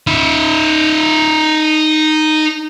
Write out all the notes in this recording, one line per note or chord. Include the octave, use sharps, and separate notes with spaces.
D#4 E5